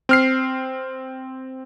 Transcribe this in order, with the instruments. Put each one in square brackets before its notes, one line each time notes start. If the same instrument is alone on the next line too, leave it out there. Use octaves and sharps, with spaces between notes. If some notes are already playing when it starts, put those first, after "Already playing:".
[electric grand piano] C4 F6 C7